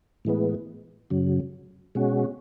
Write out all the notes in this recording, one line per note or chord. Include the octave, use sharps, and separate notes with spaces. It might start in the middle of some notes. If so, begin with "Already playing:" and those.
A2 E3 G#3 B3
F#2 C#3 F#3
B2 G#3 C#4 F#4